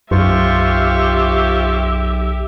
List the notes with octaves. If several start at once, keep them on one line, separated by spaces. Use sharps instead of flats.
B1 F#2 F4 G4 C5 E5 C#6